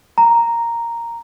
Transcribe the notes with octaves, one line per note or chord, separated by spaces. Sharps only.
A#5